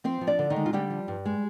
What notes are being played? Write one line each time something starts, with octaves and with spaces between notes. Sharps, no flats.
F3 C4 C5
F3
D4 D5
D3
D#3 D#4
G#3
F4
D3 G3 G4
F3
G2
G#3